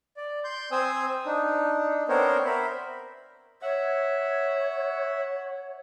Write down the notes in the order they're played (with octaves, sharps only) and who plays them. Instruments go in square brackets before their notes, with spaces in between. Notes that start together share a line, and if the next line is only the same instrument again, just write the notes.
[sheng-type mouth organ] D5
C6 G6
C4 C5 G#5 D#6 E6
D4 D#4
B3 C4 D4 A#4 C5 C#5
A#4 C5 E5 B5
[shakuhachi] C#5 [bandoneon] E5 F#5